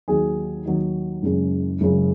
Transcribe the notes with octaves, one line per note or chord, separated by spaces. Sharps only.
D#2 D#3 F#3 G#4
D#2 D#3 F#3
F#1 F#2 C#3 G#3
F#1 F#2 C#3 G#3